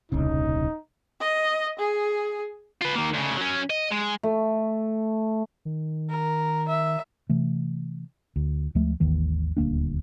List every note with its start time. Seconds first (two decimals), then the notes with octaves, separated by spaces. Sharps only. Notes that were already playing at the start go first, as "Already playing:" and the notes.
0.12 D#1 C2 C#3 D#4
1.20 D#5
1.79 G#4
2.81 F4 B4
2.95 D#3 A#3
3.14 D2 C#3
3.37 F#3 C#4
3.70 D#5
3.91 G#3
4.23 A3
5.65 D#3
6.10 A#4
6.68 E5
7.30 C3 E3 A3
8.36 D2
8.75 D2 F3 G#3 A3
9.00 G#1 D#2 D#3 E3
9.57 D#1 D2 A#3 D4